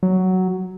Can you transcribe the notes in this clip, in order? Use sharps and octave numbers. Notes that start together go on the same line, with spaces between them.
F#3